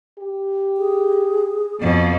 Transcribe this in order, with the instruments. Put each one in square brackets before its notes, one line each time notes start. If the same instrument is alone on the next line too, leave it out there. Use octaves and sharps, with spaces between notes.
[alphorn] G4
[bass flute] G#4
[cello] F2 B2 [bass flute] F3